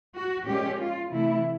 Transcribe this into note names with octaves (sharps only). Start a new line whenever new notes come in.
F#4
A#2 F3 G#3 C#4 G4
F4
C3 E3 A3 E4